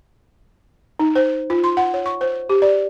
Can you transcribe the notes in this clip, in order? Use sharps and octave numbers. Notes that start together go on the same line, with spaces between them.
D#4
C5
F4
C6
F#5
C#5
C#6
C5
G4
D5